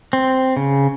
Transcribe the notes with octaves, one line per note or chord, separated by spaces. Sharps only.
C4
C#3